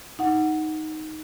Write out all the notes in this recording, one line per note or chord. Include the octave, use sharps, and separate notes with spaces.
D#4 F#5